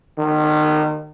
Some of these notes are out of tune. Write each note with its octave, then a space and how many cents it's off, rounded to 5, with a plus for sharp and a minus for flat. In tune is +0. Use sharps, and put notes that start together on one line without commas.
D#3 -35